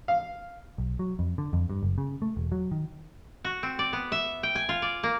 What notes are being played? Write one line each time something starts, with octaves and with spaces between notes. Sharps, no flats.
F5
B1
F#3
F2
D3
F2
G2
F#1
C#3
A3
E1
F#3
D#3
F#4
C4
D5
B3
E5
G5
G#5
F4
D5
A#3